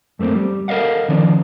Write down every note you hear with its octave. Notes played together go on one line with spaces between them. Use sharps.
F#2 A3 A#3 C4
G3
A4 A#4 C5 D#5 F5 F#5
D3 D#3 F3 C#4 D5